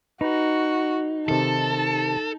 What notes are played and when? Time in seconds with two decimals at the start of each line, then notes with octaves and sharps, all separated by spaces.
0.21 D#4 F#4 B4
1.28 C3 D#3 A4 A5